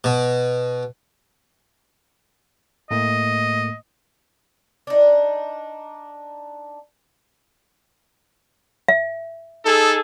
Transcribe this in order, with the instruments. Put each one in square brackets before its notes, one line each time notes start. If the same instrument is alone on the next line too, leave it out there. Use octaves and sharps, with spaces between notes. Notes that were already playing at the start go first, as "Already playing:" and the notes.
[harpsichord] B2
[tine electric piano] A2 A3 A#3 [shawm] D#5
[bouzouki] D4 D#4
[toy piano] E5
[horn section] D#4 G#4 A4